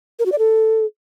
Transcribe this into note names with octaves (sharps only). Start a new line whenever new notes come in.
A#4
F#4
D5
A4